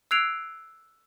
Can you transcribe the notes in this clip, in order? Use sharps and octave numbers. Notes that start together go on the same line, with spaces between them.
E6 F#6 G#6 C7 D7 F7